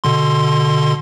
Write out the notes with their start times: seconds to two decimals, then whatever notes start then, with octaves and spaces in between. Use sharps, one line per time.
0.04 B2 D3 C6